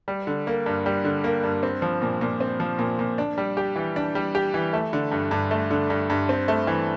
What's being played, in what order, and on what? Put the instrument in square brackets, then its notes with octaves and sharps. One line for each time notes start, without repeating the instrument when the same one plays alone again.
[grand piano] G3
D3
A#3
G2
G3
D3
A#3
G2
C4
F3
A#2
A#2
C4
F3
A#2
A#2
D4
G3
G4
E3
D4
G3
G4
E3
A3
D3
G2
G2
A3
D3
G2
G2
C4
A3
E3